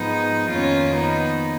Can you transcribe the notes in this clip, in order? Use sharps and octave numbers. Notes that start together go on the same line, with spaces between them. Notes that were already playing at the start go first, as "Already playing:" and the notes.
Already playing: G#2 F3 G#3 B3 D#4
F2 D#3 A#3 C#4 F4
B3 D#4